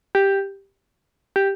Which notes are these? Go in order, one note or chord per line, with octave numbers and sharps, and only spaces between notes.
G4
G4